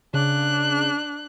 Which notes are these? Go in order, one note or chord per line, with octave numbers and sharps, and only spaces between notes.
C#3 D4 F#6